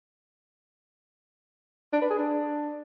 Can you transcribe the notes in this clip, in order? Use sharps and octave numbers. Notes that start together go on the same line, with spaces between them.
D4
B4
G#4
D4